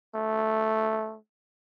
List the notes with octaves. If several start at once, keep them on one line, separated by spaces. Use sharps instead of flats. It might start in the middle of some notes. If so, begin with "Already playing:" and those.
A3